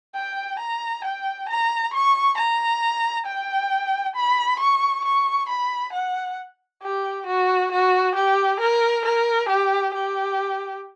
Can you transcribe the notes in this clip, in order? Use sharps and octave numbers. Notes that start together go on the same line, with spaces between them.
G5
A#5
G5
A#5
C#6
A#5
G5
B5
C#6
C#6
B5
F#5
G4
F#4
F#4
G4
A#4
A#4
G4
G4